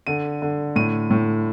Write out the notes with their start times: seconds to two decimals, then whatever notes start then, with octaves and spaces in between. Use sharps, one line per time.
0.07 D3 D#7
0.42 D3
0.76 A2 D#7
1.11 A2